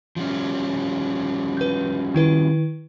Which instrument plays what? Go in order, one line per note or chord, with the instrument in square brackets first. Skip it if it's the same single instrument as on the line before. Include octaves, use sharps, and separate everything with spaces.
[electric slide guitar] F3 G3 C#4
[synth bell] B4 G6
D#3 E4 B4